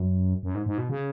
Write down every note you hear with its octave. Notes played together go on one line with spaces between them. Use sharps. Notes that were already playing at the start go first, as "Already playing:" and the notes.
Already playing: F#2
F#2
G#2
G#2
B2
C#3